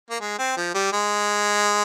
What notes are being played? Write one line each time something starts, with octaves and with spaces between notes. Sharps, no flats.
A#3
G#3
C4
F3
G3
G#3